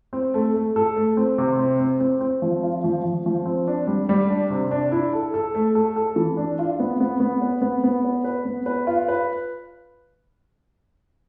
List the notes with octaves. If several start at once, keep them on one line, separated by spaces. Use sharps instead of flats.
C4
A3
A3
A4
A3
C4
C3
C4
C4
C4
C4
F3
F4
F3
F3
F3
C4
D4
G3
G3
D4
C3
D4
E4
A4
A4
A3
A4
A4
E3
D4
F4
B3
B3
B3
B4
B3
B3
B4
B4
B3
B4
F4
B4